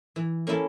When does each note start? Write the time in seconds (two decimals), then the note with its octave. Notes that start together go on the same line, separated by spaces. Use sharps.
0.16 E3
0.47 A#3 C#4 E4 A4